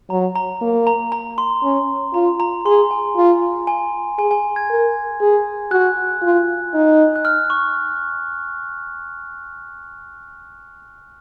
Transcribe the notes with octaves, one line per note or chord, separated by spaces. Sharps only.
F#3 A#5
A#5
A#3
A#5
A#5
C6
C#4
F4 A#5
A#5
G#4 C6
G#5
F4
G#5
G#4 G#5
G#5
G#6
A#4
G#4
F#4 F#6
F4
D#4
F#6
F6
C#6